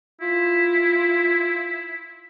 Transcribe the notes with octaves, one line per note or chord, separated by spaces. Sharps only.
E4 F4